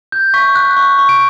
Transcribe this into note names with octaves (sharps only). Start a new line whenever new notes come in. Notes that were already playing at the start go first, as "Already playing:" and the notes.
G6
C#6 B6
F#6
C#6
C#6
D7